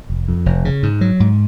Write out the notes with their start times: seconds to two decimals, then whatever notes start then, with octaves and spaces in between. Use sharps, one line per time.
0.10 F1
0.28 F2
0.46 F1
0.65 C#3
0.83 G#2
1.01 F#3
1.20 G#2